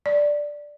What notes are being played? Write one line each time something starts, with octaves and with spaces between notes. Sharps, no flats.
D5